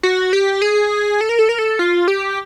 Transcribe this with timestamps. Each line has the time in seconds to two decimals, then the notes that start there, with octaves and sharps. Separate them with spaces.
0.03 F#4
0.33 G4
0.62 G#4
1.21 A4
1.29 A#4
1.39 A4
1.49 A#4
1.59 A4
1.79 F4
2.08 G4